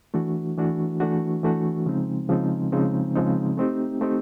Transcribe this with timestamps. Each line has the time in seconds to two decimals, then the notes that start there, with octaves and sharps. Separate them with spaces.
0.14 E3 A3 D4 F#4
0.57 E3 A3 D4 F#4
1.00 E3 A3 D4 F#4
1.43 E3 A3 D4 F#4
1.86 C#3 F3 G#3 C4 D#4
2.29 C#3 F3 G#3 C4 D#4
2.72 C#3 F3 G#3 C4 D#4
3.15 C#3 F3 G#3 C4 D#4
3.58 A3 C4 D#4 G4
4.01 A3 C4 D#4 G4